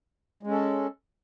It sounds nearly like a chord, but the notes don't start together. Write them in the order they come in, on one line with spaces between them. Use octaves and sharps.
G#3 C#4 A4